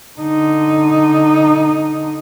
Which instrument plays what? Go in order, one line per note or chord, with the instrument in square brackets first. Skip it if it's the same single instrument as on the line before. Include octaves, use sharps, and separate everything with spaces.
[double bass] D3 D#4